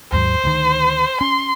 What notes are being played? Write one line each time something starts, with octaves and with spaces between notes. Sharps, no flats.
D#2 G#2 F#3 C5
D2 D#3
C#4 C6